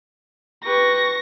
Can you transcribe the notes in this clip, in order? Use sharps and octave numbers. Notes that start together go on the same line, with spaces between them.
G4 B4 C#6 A#6